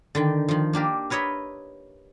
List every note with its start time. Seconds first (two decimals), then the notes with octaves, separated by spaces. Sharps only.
0.15 D3 D#3 G5
0.49 D#3 F3
0.73 A#3 D4 G4 A#4
1.10 A#4 B4 C#5 D#5 E5